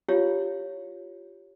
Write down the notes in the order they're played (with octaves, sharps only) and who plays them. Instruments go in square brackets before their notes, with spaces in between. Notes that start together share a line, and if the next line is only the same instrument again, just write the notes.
[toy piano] E4 F4 G4 C#5 F5